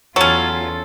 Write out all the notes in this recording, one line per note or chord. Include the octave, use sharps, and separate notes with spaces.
E2 F#3 C#4 F4 A4